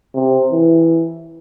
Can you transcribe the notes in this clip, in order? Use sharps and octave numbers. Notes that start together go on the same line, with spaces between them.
C3
E3